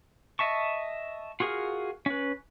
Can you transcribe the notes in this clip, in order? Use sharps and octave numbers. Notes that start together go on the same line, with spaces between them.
D#5 E5 A5 C#6
F4 F#4 G#4 A#4 F5
C#4 B4